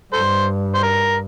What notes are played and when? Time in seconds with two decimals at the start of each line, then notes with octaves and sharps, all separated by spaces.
0.13 G2 A4 C5
0.75 C5
0.83 A#4